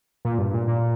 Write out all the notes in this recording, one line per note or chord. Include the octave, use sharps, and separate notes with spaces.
A#2
G2
A#2
A#2